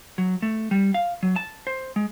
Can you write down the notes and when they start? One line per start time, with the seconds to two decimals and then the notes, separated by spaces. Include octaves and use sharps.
0.18 F#3
0.42 A3
0.71 G3
0.94 F5
1.23 F#3
1.36 A5
1.67 C5
1.96 G#3